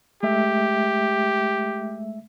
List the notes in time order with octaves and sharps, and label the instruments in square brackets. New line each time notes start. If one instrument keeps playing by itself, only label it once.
[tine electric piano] G#3 A3 E5 [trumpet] G4